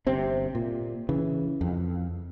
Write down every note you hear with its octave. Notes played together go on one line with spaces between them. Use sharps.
G1 C3 C4
A#2
C#3 E3
F2